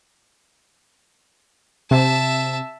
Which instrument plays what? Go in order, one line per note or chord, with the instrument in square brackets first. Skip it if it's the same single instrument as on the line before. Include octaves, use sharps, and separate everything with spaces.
[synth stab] C3 [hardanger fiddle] E5 A5